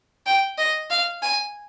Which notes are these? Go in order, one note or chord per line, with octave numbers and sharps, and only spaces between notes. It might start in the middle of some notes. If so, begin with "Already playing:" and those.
G5
D#5
F5
G#5